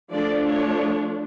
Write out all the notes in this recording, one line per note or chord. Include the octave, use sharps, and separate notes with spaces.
F3 A3 D4 D5
C#5